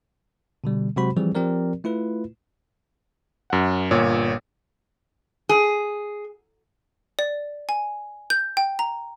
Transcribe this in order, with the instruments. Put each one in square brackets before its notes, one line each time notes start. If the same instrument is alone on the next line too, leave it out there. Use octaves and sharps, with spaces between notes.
[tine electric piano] B2 D3 G3
C3 F#3 G#3 F#4 C5 B5
E3 F3 G3 C4 G#4
F3 C4 G4 A#4 D5
A3 E4 F4 B4
[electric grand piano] F#2 F#5
G1 A#2 C#5
[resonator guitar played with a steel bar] G#4
[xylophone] D5
G#5
G6
G5
A#5